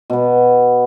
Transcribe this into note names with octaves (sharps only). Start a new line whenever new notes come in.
B2 B3